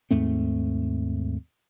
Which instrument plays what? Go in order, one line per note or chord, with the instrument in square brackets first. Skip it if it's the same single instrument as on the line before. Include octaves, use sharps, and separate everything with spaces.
[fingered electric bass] D#2 G#2 A3 C4